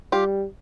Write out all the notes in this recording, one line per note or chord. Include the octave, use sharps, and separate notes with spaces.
G3 F4 G4